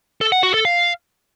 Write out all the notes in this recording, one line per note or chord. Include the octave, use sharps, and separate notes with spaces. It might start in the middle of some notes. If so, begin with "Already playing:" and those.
A4
F#5
F#4
A4
F5